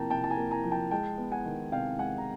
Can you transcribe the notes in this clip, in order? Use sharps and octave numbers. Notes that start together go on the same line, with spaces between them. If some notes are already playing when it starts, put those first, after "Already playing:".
Already playing: C3 F3 A#3 G5 A5 A#5
C3 G5 A5
A5
G#5 A#5
A#3
G#5 A#5
F3
G5 A5
G#3 G5 A5
B3
F#5 G#5
D#3
C3 F5 G5
G#3 F#5 G#5
A#5